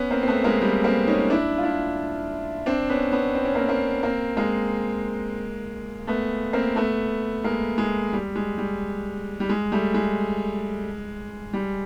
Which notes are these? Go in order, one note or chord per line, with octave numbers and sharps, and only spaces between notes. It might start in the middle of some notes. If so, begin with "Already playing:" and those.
Already playing: B3 C#4
A#3 C4
C4
A3 B3
G#3 A#3
G3
A#3 C4
C#4 D#4
D4 E4
F4
D4 E4
C4 D4
B3 C#4
B3 C#4
C4
C#4
A#3 C4
A#3 C4
A#3 C4
G#3 A#3
A3 B3
A#3 C4
A3 B3
G#3 A#3
G#3
G3
G#3
G3
G3
G#3
G3 A3
G#3
G3